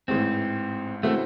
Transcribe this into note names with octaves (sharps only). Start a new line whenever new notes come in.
A1 G#2 E3 C4
C#3 E3 A3 C4 F#4